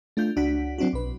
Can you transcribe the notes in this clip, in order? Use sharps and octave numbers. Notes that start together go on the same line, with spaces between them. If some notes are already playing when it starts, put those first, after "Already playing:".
A3 D4 F4 G6
C#2 D4 F#4 F#5 B6
F#3 C4 D4 E4 F#4
B1 B4